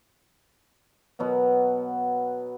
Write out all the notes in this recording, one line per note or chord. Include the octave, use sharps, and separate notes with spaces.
B2 F#3 B3